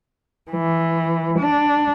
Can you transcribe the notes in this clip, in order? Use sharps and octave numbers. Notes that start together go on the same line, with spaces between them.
E3
D4